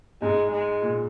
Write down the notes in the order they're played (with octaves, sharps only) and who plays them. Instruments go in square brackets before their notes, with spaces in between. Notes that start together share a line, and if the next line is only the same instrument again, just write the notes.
[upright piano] G#2 [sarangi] G#3
[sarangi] G#3
[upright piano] A#2